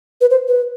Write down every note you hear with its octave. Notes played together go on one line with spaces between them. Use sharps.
B4
C5
B4